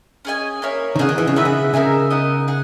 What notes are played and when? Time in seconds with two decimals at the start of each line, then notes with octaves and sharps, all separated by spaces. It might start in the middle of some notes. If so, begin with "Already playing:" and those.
0.25 C#4 G#4 D#5 G#5
0.62 A#3 E4 A#4 C#5
0.96 D#3
0.99 C#3 G#4 D#5 F#5
1.09 D#3
1.18 E3
1.27 C#3
1.36 D#3 B3 F#4 B4 E5
1.45 C#3
1.73 C#3 D#4 A#4 E5 G#5
2.10 B3 D#4 A#4 D#5
2.48 G#4 F#5